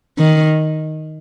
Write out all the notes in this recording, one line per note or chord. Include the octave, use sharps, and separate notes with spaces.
D#3